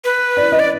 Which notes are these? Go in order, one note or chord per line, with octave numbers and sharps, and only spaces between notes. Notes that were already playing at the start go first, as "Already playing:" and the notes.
B4
D5
D#5
D5